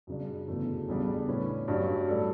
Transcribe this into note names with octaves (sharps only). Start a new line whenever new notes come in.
F#2 C#3 G3 D4
G1 F#2 C#3 E3 A3
E2 C#3 G3 D4
A2 G3 C#4 E4 B4
G2 F#3 C#4 G4 D5
A2 G3 D4 A4